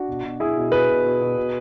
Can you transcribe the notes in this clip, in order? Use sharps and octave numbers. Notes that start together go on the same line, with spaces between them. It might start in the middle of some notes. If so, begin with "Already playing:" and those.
Already playing: D4 F#4
B2
B2
B2 E4 G#4
B2
B2 G#4 B4
B2
B2
B2
B2